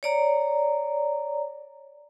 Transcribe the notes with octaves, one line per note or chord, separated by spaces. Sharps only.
C#5 D5 A#5